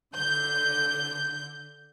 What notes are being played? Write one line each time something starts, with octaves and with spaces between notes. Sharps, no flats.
D3 G6